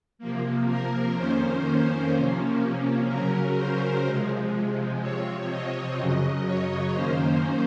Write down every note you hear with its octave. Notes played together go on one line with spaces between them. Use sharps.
C3 F3 A#3
A#4
F2 D#3 A#3 C#4 C5
C5
C3 F3 A#3 C#4
C#3 F#3 C#4 A#4
C5
C3 F3 G#3
C3 F3 C4 C#5
D#5
F#2 C#3 F#3 D#5
C#5
F#2 D#3 A#3 C#4 C5